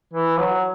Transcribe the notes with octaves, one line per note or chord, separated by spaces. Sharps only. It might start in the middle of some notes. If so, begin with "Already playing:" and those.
E3
F#3